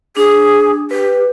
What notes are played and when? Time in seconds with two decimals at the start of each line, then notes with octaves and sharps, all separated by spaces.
0.17 D4 G#4
0.91 G4 B4